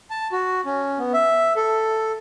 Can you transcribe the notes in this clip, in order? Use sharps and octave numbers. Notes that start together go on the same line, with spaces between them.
A5
F#4
C#4
B3
E5
A4